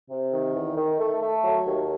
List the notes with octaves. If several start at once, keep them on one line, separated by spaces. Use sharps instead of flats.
C3
D#3
E2
D#3
A3
A3
F#3
D#2